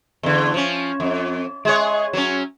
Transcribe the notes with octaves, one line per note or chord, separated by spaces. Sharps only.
E2 D3
F3 C#4
F2
G#3 G#4 C#5
F#3 C#4